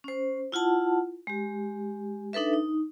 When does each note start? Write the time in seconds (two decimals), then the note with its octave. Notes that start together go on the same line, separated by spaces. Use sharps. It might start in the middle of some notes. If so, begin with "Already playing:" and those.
0.04 C#4 C5
0.52 E4 F4 F#5 A5
1.27 G#3 G4
2.33 D4 D#4 A4 B4 E5
2.53 D#4